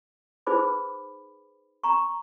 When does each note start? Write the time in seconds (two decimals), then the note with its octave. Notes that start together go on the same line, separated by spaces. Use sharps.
0.47 D#4 G#4 B4 C5 B5 D6
1.84 A#5 C#6